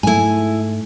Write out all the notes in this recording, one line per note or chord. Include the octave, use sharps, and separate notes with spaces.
G#2 A3 E4 G#5